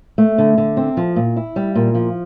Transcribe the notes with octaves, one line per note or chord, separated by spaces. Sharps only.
A3
D3
D3
C4
F3
A#2
E4
G3
A#2
F3